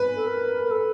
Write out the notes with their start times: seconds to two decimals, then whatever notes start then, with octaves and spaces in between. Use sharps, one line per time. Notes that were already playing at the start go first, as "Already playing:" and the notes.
Already playing: B4
0.16 A4
0.27 A#4
0.65 A#4
0.71 A4